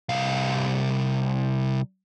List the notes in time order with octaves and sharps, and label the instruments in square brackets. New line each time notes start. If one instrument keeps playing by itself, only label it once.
[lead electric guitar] C2 F5